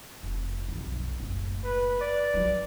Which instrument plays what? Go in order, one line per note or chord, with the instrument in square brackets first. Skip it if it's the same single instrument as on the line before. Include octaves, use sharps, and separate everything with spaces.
[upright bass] F1
B1 F2
F#1 A2
[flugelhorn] B4
D5
[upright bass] F#3 G3